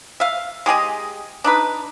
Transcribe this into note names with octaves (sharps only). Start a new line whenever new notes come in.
E5 F5
G#3 G4 G#4 D#5
D4 D#4 B4